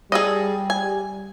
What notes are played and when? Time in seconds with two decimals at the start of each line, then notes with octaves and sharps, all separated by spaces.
0.12 G3 G#4 A4 D#5
0.70 G#5